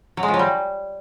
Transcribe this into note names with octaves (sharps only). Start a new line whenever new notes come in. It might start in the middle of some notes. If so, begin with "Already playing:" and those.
F#3
G#3
F3
F#3
G3